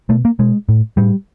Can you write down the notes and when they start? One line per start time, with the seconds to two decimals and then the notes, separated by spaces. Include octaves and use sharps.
0.09 B2 A3
0.25 A#3
0.39 B2 G#3
0.69 A2
0.97 A2 G3